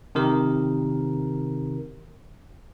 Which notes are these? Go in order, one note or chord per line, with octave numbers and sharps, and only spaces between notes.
C3 D#3 A#4